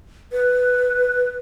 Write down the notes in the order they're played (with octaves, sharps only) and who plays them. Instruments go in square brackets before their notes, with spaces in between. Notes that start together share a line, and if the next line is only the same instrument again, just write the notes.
[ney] B4